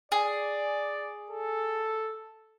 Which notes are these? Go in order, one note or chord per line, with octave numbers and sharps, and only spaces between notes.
G#4 D5
A4